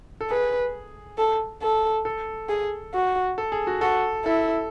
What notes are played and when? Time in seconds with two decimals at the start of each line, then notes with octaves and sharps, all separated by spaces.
0.21 A4
0.30 G#4 B4
1.18 A4
1.62 A4
2.05 A4
2.49 G#4
2.94 F#4
3.38 A4
3.52 G#4
3.67 F#4
3.81 F#4 A4
4.25 E4 A4